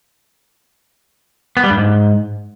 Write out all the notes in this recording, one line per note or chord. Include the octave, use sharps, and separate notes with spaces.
B3
G3
G2
G#2